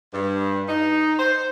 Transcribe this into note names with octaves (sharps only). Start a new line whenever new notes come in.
G2
D#4
C5